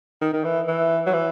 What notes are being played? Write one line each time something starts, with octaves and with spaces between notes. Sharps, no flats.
D#3
D#3
E3
E3
F#3
E3